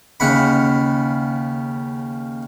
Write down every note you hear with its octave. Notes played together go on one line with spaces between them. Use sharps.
D#2 C#3 F#5 B5